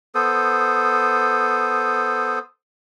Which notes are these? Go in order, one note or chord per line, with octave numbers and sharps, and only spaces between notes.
B3 A4 C5 D#6